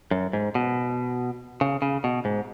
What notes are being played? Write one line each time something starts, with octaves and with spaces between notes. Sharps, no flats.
F#2
G#2
B2
C#3
C#3
B2
G#2